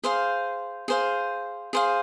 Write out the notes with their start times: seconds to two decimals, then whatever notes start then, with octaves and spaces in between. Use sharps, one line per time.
0.04 G#4 C5 F5
0.88 G#4 C5 F5
1.73 G#4 C5 F5